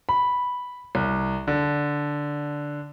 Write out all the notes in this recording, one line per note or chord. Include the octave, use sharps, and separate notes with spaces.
B5
C2
D3